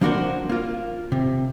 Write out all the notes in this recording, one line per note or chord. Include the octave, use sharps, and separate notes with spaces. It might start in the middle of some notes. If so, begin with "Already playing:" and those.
F3 A#3 D4 F#4 A#4 C5
A#3 F4
C3